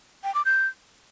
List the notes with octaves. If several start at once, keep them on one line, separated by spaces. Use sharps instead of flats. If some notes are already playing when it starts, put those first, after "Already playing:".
G5
D6
G6